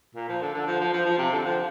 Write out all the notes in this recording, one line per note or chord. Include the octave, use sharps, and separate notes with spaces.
A#2
F3
D3
D3
F3
F3
F3
F3
C3
D3
F3